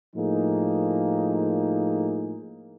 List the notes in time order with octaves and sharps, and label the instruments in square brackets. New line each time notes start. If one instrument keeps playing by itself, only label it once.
[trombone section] A2 F3 A#3 D#4 G#4